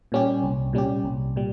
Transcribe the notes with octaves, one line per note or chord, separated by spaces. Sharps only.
A#2 G3 C#4 G4
C2
A#2 G3 C#4 G4
C2
A#2 G3